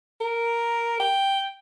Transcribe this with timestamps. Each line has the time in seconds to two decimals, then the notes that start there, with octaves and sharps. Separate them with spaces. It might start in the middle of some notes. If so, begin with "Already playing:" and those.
0.21 A#4
1.00 G5